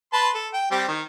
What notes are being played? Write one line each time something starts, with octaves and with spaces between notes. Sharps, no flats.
B4 A5 C6
A4
G5
G3 C4 G4
D#3